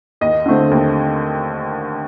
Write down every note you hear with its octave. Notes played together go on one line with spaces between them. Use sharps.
D#2 D#5
D3 A3 C4
D#2